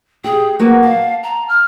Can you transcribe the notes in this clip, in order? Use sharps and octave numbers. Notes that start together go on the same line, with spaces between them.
G4 G#4
F#3 A#3 F#4 B4
F5 A5
A#5
F6